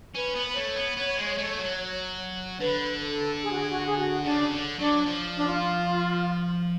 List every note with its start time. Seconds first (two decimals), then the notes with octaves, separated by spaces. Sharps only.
0.15 C#4 B4
0.35 B3
0.45 B4
0.55 A3 C#5
0.76 B3
0.97 B3
1.17 G#3
1.38 A3
1.59 F#3
2.60 D3 B4
3.02 A4
3.42 G#4
3.52 F#4
3.60 G#4
3.70 F#4
3.85 G#4
3.97 F#4
4.25 C#3 D4
4.51 D3
4.79 F#3 D4
5.06 F3
5.37 D4
5.47 F4